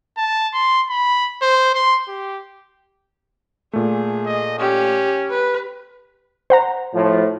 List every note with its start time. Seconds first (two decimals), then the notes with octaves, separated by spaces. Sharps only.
0.17 A5
0.54 C6
0.89 B5
1.42 C5
1.74 C6
2.08 G4
3.73 A#2 A3 G#4
4.25 D#5
4.59 C#4 G4
5.30 B4
6.50 C5 F#5 A#5
6.93 A2 F3